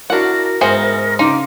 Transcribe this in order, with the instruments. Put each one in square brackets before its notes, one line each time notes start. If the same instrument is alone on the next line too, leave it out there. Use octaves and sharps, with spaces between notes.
[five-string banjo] D4 F#5 [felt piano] E4 F#4 [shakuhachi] A#4
[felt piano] G#2 E5 C#7 [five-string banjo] B3 G#4 C5
[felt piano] C#3 F5 C6 [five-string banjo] D#4 [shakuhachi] D6